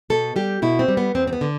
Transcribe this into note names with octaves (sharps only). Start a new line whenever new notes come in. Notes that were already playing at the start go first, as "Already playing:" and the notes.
B2 A4
G3 G4
B2 E4
C4
G3
B3
E2 C4
C4
B3
D3